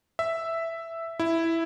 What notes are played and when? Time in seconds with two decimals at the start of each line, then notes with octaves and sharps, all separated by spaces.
0.19 E5
1.20 E4